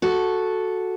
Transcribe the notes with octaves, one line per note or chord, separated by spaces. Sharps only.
F#4 A4